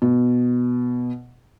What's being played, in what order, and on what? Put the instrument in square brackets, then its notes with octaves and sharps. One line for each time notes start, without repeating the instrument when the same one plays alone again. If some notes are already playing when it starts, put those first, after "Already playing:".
[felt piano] B2